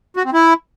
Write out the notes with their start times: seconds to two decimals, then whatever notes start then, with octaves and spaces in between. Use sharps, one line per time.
0.17 F#4
0.25 C4
0.33 E4